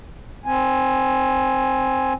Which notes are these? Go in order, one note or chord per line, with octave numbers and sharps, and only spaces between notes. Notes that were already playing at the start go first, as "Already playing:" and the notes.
C4 G#5